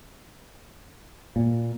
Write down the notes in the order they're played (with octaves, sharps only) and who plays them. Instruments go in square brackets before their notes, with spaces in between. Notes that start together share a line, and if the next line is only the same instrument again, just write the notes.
[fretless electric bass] A#2